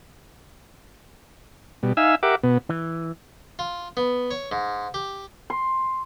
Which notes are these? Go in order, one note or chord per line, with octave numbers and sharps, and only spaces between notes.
B2 G3
D#4 E5 F5 G#5 E6
G4 A#4 E5 F#5 D6
B2 B3
E3
F4
B3
C#5
G#2
G4
C6